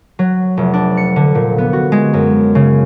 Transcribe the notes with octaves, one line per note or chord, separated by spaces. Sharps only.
F#3
F1
D4
C#7
D3
A#2
B3
F#4
G#3
F#2
C#3